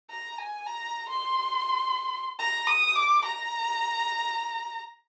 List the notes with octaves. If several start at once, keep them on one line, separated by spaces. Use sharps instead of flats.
A#5
G#5
A#5
C6
A#5
D#6
D6
A#5